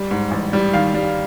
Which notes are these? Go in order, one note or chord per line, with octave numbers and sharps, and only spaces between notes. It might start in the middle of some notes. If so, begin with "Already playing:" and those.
Already playing: G3
G#2
A1
G3
D#3 F5
G3